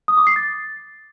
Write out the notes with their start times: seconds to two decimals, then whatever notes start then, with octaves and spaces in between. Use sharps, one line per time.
0.08 D#6
0.17 D6
0.27 C7
0.36 A6